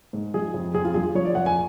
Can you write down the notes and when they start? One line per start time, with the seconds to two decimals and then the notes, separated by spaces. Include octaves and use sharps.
0.13 G#2
0.34 F3 G#4
0.54 F2
0.74 F2 G#4
0.85 F4
0.94 F3 G#4
1.15 F3 C#5
1.25 D5
1.35 F2 F#5
1.46 G#5